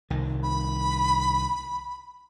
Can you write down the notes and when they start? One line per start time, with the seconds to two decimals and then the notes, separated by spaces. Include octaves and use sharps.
0.10 C2 D#3
0.43 B5